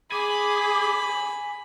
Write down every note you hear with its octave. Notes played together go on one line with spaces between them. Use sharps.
G#4 G#5 B5 D6